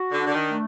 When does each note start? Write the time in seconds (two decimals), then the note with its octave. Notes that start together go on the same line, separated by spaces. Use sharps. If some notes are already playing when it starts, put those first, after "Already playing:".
Already playing: F#4
0.12 D3
0.19 D4
0.27 D3
0.34 D#3
0.49 A3